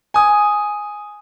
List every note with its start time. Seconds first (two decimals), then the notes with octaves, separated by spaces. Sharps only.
0.14 G#5 D#6